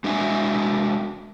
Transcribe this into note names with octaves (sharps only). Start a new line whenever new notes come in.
G#3 D4 F#4 E5 G#5